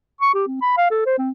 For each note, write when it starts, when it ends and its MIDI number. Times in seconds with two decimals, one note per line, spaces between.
0.21 0.34 85
0.35 0.45 67
0.47 0.60 60
0.61 0.75 83
0.77 0.86 77
0.91 1.04 69
1.06 1.18 72
1.19 1.31 60